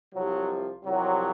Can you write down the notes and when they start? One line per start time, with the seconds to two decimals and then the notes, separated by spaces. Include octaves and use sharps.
0.14 C2 C3 F3 F#3
0.84 C2 C3 F3 F#3